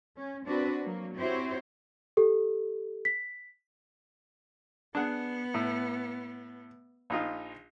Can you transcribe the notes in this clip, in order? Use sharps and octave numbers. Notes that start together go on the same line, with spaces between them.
C#4
C4 D4 F#4 B4
F#3 A#3
C4 E4 F#4 G4 C5 C#5
G4 A4
B6
B3 D4 G#4 F#5
A2
A#1 D#4 F4